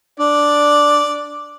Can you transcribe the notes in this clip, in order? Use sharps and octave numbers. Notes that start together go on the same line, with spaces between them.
D4 D5